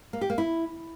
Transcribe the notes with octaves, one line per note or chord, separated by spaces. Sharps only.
A#3
G4
A#3
E4